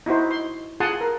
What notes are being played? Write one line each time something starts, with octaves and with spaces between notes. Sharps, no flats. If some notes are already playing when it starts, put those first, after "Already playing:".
D#4 E4 F#4 C5
C6
F4 G#4 F#5 A5 C6 D#6
A#4